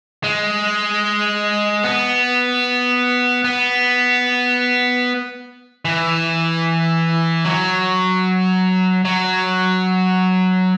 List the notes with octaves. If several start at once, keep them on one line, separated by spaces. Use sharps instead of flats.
G#3
B3
B3
E3
F#3
F#3